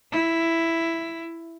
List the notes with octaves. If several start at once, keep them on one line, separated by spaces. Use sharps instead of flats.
E4